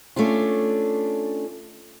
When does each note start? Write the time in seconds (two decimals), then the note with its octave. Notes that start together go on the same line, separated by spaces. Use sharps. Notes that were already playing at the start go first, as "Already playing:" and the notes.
0.16 A3 C#4 D4 F4